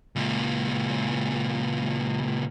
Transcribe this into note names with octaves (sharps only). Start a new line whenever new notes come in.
C#2 A#2